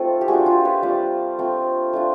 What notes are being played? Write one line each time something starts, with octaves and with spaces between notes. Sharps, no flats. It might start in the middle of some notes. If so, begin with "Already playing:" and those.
Already playing: A3 C4 D#4 F4 A4
G4
A3 D4 F4 F#4 G#4
F4 G4
B4 C#5
G3 C4 F4 C5 D5
A3 C4 F4
A3 D4 F4